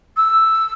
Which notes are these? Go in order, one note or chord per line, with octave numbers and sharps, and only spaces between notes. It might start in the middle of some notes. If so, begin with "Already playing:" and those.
E6